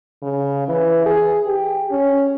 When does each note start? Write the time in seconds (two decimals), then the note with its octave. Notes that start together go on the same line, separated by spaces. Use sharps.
0.22 C#3
0.68 E3
1.06 G#4
1.46 G4
1.91 C#4